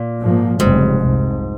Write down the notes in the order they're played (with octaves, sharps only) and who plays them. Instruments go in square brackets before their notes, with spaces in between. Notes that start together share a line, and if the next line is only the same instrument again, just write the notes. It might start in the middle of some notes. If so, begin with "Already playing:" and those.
Already playing: [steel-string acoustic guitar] A#2
[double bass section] G#2 F3 A#3
[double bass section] F1 F2 C#3 G3 [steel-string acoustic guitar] G#2
[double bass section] C2 C3 F3